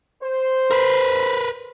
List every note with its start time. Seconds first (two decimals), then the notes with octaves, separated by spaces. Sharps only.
0.23 C5
0.71 A#4 B4